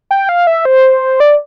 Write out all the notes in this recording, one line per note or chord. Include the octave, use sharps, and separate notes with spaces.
G5
F5
E5
C5
D5